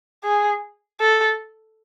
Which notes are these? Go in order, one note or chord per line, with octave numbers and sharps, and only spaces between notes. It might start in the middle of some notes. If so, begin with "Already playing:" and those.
G#4
A4